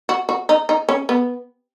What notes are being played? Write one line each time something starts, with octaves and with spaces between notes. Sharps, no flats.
F#4
F#4
D#4
D#4
C#4
B3